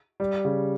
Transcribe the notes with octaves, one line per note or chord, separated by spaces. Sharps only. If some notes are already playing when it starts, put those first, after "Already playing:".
G3
C#3